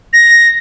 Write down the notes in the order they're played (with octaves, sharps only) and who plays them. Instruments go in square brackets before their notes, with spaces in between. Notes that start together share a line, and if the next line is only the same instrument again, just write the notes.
[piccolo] A#6